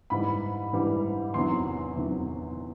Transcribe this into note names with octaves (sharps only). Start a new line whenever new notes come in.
G#2 E3 G3 B5
G#2 E3 G3
E2 C3 D#3 F#3 C6
E2 C3 D#3 F#3